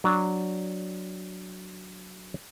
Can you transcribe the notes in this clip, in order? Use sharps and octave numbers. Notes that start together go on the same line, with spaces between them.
F#3 D4